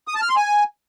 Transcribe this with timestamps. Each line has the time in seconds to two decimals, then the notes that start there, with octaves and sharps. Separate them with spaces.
0.08 D#6
0.15 A5
0.22 F6
0.29 C6
0.36 G#5